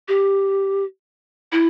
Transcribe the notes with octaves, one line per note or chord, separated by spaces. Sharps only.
G4
E4